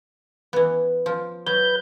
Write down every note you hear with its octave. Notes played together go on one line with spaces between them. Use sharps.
E3 B3
F3
F#3 B4 G6